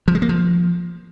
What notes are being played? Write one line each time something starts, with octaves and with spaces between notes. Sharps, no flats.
F3
G#3
A#3
F3